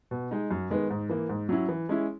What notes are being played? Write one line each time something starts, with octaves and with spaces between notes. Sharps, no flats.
B2
G#3 D#4
F#2
D#3 G#3 B3
G#2
E3 A#3
G#2
F#3 C#4 E4
E3
G#3 C#4 E4